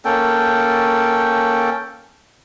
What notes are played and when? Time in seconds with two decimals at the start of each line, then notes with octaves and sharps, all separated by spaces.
0.05 A#3 C#4 A4 G5